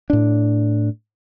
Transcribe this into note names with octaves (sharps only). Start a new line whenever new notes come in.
A2 D4